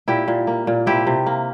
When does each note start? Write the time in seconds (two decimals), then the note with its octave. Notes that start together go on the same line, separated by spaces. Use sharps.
0.08 A#2 E4 G4
0.28 A#2
0.47 A#3
0.67 A#2
0.86 C3 E4 G4
1.07 C3
1.26 A#3